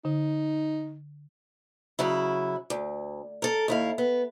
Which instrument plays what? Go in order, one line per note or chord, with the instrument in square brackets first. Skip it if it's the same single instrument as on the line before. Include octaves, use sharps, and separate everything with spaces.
[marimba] D3 [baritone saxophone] D#4
[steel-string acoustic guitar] C#3 F#3 E4
D2
A4 A#4
D#2 E4 F5
B3